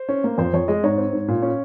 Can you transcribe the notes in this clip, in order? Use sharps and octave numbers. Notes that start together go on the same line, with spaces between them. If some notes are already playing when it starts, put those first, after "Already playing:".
Already playing: C5
C#4
A#3
F2 C5
F2 C#5
G#3 D#5
G#2 C#5
C4
G#2
A#2
C#4